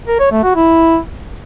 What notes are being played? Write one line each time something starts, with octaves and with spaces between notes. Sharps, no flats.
A#4
C#5
A3
F#4
E4